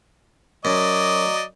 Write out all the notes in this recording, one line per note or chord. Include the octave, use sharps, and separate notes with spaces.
F#2 F#3 D5 D#5